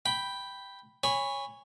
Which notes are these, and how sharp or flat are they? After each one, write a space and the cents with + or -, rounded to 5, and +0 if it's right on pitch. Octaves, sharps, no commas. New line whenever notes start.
G5 +0 B5 +0
C#5 +0 G#5 -20 B5 +10